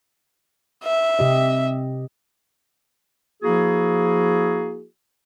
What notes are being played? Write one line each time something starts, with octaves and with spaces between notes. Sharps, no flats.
E5
C3 G4 D#5
F3 A#3 E4 F#4 G#4